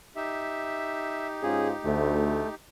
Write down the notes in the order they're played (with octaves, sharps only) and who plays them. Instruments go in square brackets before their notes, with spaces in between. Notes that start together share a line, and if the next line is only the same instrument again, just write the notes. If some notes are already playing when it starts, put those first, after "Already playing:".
[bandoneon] D#4 G4 [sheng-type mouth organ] E5
[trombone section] G#2 C#4 F4 [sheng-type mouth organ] G#4
[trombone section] D2 [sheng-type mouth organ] A3